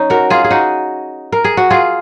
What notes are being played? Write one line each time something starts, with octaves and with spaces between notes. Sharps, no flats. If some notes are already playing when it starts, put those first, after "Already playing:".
Already playing: C#4 D#4
F#4 A#4
F4 G#4
G#4
D#4 F#4
A#4
G#4
F#4
F4 G#4